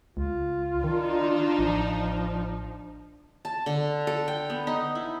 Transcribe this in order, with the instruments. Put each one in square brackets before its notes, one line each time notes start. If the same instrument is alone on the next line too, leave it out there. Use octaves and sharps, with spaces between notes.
[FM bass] C#2 [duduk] F4
[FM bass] D#3 [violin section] D4 D#4
[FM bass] A1 [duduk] F3
[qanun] A5
D3
A4
G5
B3
D#4
E4